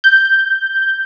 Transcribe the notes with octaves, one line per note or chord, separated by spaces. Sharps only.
G6